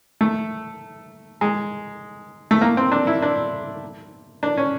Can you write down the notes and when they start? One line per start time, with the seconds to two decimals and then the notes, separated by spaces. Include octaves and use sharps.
0.21 A3
1.41 G#3
2.51 A3
2.61 A#3
2.77 C4
2.92 D4
3.07 E4
3.22 D4
4.43 D4
4.57 C#4